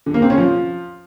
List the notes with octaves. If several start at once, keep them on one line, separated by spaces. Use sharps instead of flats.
D3
A#3
C4
C#4
F3